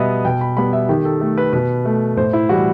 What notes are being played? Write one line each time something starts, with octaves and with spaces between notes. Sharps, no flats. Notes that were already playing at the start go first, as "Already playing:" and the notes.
Already playing: B2 G3 B3 D#5 E5
B2 G5
B5
G3 B3 B5
E5
D#3 G4
A4
A3 A4
B4
B2 B4
A3
A2 C5
E4
E3 G3 F#4